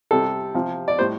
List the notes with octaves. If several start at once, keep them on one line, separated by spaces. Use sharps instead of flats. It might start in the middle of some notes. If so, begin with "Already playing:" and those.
C3 G3 A4
C3 F3
D5
A2 G3 C5